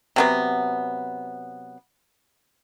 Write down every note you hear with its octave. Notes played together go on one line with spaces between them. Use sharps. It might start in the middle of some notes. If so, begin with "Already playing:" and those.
C3 F#3 B3